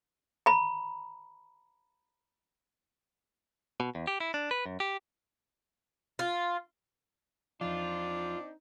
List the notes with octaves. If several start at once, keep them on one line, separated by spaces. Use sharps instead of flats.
A#5 B5
B2
E2
G4
E4
D4
B4
F#2
G4
F4
E2 F3 C4 D4 D#4 F4